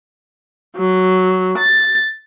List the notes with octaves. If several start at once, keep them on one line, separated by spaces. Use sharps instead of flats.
F#3
A6